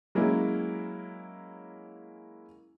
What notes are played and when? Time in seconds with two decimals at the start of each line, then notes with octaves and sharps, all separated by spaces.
0.15 F#3 G#3 A#3 C#4 E4